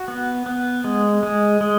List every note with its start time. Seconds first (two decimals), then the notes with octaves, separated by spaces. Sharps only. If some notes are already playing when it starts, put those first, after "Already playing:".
Already playing: F#4
0.08 B3
0.46 B3
0.84 G#3
1.23 G#3
1.61 G#3